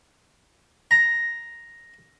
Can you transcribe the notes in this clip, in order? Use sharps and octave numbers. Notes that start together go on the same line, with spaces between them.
A#5